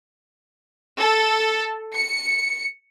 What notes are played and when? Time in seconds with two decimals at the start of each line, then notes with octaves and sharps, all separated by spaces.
0.99 A4
1.95 C#7